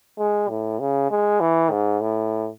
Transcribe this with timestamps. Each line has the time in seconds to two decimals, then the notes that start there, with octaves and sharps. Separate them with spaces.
0.18 G#3
0.49 A2
0.80 C#3
1.11 G#3
1.40 E3
1.71 G#2
2.01 A2